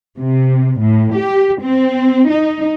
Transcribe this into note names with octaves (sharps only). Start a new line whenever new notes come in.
C3
A2
G4
C4
D#4